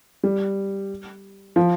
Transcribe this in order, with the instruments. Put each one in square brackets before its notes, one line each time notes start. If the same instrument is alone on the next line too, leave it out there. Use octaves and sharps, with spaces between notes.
[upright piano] G3
F3